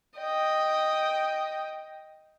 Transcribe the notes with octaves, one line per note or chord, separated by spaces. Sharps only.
D#5 G5